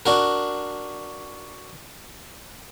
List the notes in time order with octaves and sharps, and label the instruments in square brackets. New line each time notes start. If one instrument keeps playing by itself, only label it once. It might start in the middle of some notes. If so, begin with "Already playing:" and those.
[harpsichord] D4 F#4 A#4